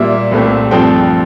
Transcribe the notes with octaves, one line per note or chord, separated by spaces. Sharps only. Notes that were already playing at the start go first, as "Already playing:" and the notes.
Already playing: A#2 G3 A#3 E5
C2 A#2 A3 C4
G2 F3 A3 C4 G5